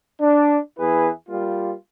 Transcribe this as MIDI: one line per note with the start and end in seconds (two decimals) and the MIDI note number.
0.21 0.58 62
0.79 1.09 40
0.79 1.09 64
0.79 1.09 68
0.79 1.09 71
1.29 1.73 55
1.29 1.73 58
1.29 1.73 65